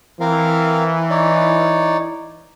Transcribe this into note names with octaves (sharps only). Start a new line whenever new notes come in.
E3 C4 A#4 F5
D#4 C#5 D5